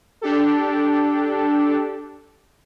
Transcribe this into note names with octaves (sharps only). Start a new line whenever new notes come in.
D4 G4 A4